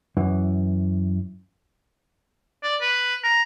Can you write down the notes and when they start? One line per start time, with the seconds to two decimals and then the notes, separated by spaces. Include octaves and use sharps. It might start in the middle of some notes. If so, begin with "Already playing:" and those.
0.17 F#2 E3
2.63 D5
2.81 B4
3.24 A#5